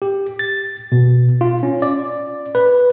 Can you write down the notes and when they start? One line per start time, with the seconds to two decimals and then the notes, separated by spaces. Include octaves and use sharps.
0.02 G4
0.39 A6
0.92 B2
1.41 F4
1.63 C#4
1.82 D5
2.55 B4